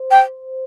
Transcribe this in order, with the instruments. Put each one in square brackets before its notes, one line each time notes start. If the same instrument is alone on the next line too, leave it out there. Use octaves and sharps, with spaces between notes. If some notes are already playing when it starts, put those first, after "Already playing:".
Already playing: [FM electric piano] C5
[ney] G5